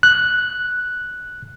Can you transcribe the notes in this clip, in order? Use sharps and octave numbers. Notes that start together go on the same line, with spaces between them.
F#6